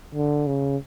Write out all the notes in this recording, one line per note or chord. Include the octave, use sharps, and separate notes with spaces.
D3
C#3